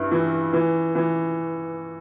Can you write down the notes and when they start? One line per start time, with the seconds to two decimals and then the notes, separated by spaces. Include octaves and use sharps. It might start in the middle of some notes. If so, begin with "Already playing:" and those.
Already playing: G2 E4
0.11 E3
0.53 E3
0.95 E3